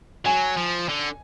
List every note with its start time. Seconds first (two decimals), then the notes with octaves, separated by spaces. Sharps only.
0.25 F#3 G#5
0.57 F3
0.89 D3